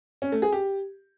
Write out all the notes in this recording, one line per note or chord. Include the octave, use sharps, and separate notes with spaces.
C#4
A3
G#4
G4